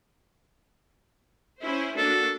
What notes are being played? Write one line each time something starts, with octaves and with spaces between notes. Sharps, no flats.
C#4 E4 C5
A#3 D4 F#4 A4